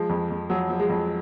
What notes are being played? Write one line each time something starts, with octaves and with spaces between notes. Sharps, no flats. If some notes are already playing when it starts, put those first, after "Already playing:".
Already playing: F3 G#3
F2
F2
F3 F#3
F3
G#3
F2